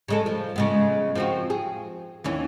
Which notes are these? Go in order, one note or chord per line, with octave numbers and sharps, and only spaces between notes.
C#3 G#3 A4
F3
C#3 G#3 B3
F3 C4 F#4
G#4
D#2 E3 C#4